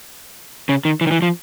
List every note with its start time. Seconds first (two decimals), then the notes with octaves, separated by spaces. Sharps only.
0.69 C#3
0.85 D#3
1.01 E3
1.07 D#3
1.11 E3
1.22 F3